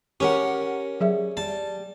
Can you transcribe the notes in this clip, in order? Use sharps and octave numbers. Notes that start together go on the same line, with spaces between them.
C#4 G4 A#4 F#5
F#3 G#4 E5
G3 A5